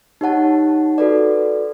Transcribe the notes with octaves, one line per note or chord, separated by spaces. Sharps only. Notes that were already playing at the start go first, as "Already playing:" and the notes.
D#4 G4 C#5 F#5 A5
F#4 A4 B4 D5